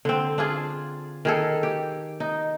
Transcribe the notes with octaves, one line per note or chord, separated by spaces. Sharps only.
D3 C4
D4 F4 G#4
D#3 G#4 A4
G4
D#4